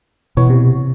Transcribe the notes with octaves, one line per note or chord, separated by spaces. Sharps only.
B2 E3 B3 C#5
C3